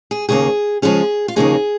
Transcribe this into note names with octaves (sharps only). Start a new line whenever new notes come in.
G#4
D#2 C#3 A#3 G#4
C#3 F3 G#3 C#4 G#4
F4
D#2 C#3 F3 A#3 D#4 G#4